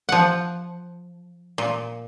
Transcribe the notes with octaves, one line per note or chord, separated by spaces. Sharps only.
F3 F#5
A#2